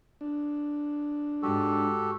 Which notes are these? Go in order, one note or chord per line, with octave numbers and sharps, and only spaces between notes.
D4
G#2 F#4 G4 A4